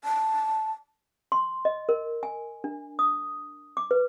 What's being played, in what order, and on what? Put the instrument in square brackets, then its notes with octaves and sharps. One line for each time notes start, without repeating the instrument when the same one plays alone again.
[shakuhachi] A5
[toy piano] C6
D#5
A#4
G#5
D4
D#6
D6
B4